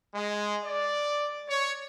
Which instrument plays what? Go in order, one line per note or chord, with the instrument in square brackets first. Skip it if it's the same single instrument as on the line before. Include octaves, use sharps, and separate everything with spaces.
[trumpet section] G#3
D5
C#5